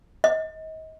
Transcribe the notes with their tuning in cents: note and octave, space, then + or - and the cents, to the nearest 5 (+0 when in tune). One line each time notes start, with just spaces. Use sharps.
D#5 +35